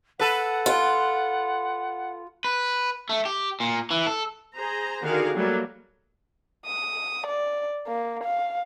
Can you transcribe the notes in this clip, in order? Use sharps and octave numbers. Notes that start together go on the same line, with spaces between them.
A4 B4 F#5
F4
B4
A3
G4
A#2
E3
A4
G#4 C5 A#5
D3 D#3 F#4 G#4 A#4 F5
F#3 G3 A3 A#3
D#6
D5
A#3
F5